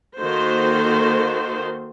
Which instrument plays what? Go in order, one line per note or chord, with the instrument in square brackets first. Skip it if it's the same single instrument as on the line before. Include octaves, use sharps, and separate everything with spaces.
[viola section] D#3 A#3 F#4 A4 C5